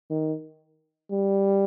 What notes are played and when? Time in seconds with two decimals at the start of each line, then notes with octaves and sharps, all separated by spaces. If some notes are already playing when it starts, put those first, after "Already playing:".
0.10 D#3
1.11 G3